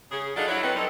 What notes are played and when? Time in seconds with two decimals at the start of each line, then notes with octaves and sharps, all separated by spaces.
0.11 C#3 G#4
0.36 F#3 D4 D#4 F4 G#4 A4
0.48 F#3 E4
0.63 C4 C#4 A4 B4
0.75 G3 C4 D#4 E4 A4